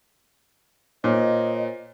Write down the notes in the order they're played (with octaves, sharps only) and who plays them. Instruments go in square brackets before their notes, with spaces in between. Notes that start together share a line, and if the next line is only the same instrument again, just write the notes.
[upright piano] A#2 [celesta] C5 C#5 [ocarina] D#5